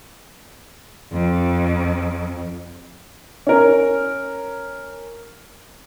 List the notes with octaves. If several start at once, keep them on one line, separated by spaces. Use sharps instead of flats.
F2
C#4 A#4